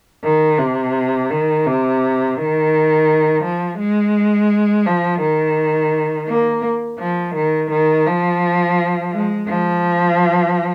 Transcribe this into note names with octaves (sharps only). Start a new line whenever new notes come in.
D#3
C3
D#3
C3
D#3
F3
G#3
F3
D#3
A#3
F3
D#3
D#3
F3
G#3
F3